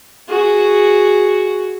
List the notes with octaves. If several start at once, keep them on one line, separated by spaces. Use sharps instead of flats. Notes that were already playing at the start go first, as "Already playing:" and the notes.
F#4 G#4